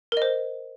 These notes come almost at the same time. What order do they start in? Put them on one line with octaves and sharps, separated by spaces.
A#4 D#5 C5